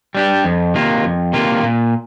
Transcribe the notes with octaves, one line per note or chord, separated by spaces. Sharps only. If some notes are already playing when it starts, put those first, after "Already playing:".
G3 D4 G4
F2
C3 D#3 A#3 F4
F2
C3 D#3 A#3 F4
A#2